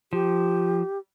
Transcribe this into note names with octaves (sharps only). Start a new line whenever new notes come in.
F3 G4